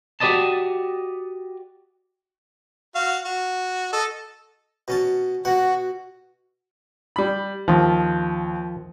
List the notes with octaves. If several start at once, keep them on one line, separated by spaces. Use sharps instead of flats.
F#4 G4 C5 D5 D#5 A5
F#4 F5
F#4
A4 D#5
B2 C#4 A5
B2 F#4 F#5
G3 B5
D#2 F3